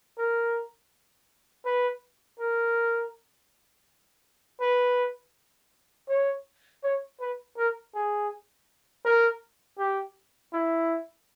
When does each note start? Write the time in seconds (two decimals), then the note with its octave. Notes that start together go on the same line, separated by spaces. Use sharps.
0.18 A#4
1.65 B4
2.39 A#4
4.61 B4
6.09 C#5
6.83 C#5
7.20 B4
7.57 A#4
7.94 G#4
9.05 A#4
9.78 G4
10.53 E4